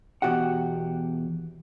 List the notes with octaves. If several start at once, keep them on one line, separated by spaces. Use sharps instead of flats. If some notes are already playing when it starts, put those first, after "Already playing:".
E2 B2 F#4 G4 F#5